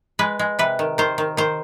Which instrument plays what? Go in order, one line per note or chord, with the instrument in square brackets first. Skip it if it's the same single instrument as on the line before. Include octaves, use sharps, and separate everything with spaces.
[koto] G#3 B4
G#3
C3 B4
D#3
D#3 C5
D#3
D#3 C5